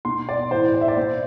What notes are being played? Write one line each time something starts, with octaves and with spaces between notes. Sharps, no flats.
B2 C6
D5
A2 E3 C5
D5
E5
D5
B2 C5